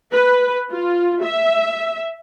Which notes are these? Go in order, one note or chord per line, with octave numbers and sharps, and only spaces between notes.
B4
F4
E5